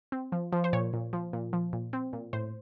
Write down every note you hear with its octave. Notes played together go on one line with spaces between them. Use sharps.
C4
F3
F3
C5
A#2 C#5
A#2
F3
A#2
F3
A#2
C4
A#2
A2 C5